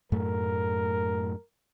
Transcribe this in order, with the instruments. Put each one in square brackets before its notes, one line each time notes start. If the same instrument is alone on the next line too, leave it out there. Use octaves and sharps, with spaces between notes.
[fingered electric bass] F#2 A2 A3 [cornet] A#4